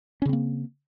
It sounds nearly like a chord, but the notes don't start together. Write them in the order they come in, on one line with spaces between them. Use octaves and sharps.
C#4 C#3 C4 A#3